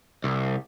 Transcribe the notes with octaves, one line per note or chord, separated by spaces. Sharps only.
C2